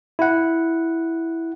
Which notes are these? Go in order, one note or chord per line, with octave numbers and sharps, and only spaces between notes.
E4 F#5